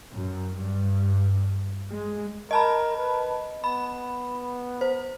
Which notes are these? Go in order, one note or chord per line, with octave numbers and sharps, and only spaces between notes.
F#2
G2
G#3
A#4 D#5 A5 B5
B4
B3 B5
C5